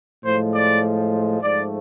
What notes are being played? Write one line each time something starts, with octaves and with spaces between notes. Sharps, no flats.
A2 F3 G#3 C5
D5
G#2 F3 A3 D5